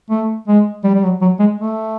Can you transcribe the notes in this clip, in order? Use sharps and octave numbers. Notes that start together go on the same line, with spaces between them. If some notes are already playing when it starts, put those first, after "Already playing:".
A3
G#3
G3
G3
F#3
F#3
G#3
A3